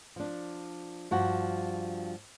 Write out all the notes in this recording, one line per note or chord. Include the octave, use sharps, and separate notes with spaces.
F3 D4
G2 F3 F#4